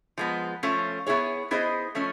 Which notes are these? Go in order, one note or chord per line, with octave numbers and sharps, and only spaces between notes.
F3 G#3 B3
F3 A3 C#4 F4
B3 E4 G#4 C#5
B3 E4 G#4 C5 D#5
F3 A3 C#4